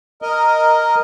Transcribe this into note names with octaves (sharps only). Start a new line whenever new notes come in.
A#4 D#5